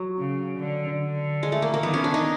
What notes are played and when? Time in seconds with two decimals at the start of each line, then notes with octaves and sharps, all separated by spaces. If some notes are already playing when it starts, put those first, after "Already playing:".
Already playing: F#3
0.19 C#3
0.59 D3
1.00 D3
1.43 G#3
1.52 A3
1.62 A#3
1.74 A#3
1.83 D#3 B3
1.94 C#4
2.04 D4
2.14 D#4